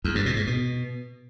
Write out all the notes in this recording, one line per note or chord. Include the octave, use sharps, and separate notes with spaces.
E2
G2
B2
G#2
B2